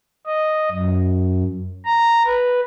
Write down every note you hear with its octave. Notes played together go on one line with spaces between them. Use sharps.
D#5
F#2
A#5
B4